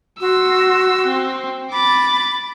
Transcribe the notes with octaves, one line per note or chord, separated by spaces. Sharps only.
F#4 C6 E6
C4
B5 D6 A6